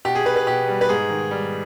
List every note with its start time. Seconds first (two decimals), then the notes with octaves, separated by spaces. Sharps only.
0.05 B2 G4
0.15 G#4
0.26 B2 B4
0.36 B4
0.47 B2 G4
0.68 G3
0.81 B4
0.89 G#2 G#4
1.10 D#3
1.31 G3